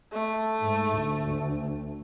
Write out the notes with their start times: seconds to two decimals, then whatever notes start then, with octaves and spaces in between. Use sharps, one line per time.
0.12 A3
0.62 G#2
0.98 D2